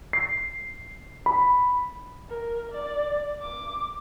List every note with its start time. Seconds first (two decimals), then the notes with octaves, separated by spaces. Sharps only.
0.13 C7
1.26 B5
2.29 A#4
2.71 D5
3.41 D6